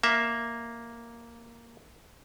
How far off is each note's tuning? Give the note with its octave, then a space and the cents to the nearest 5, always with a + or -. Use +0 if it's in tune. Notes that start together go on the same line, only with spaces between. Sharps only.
A#3 +0 E5 +0